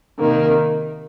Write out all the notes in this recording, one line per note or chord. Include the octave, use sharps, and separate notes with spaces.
C3 D#3 A#3